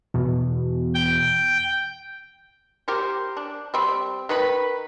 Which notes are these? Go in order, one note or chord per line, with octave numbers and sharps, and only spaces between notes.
E2 B2
G5
G4 A#4 C5
D4
G3 C4
D#3 B4 B5